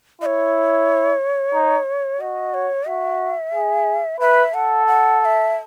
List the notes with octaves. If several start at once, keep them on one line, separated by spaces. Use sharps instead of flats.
E4 C#5 D#5
D#4
F#4 D#5
C#5
F#4 E5
G#4
B4 E5
A4 F#5
F#5
F#5
E5